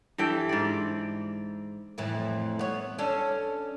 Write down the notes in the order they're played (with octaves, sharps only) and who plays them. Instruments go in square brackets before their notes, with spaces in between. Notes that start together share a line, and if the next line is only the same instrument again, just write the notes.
[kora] G2 E3 A4 G5
G#2 D5
[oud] F2 A2 E3
B3 C#5
C#4 D4 A4